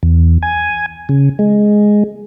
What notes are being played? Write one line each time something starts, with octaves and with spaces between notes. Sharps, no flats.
E2
G#5
C#3
G#3